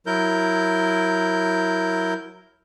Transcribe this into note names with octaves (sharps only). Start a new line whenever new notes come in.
F#3 E4 A#4 G6